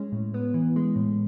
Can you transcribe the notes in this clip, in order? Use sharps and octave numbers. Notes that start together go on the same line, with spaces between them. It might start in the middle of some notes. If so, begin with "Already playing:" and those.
Already playing: G#3 C#4
A2
B3
E3
G#3
A2